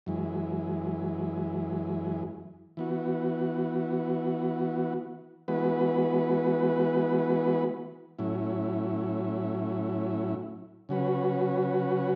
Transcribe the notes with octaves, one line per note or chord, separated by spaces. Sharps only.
F#2 E3 G#3
E3 B3 F#4
E3 G#3 B3 F#4 B4
A2 F#3 C#4 E4
C#3 F#3 C#4 F#4 B4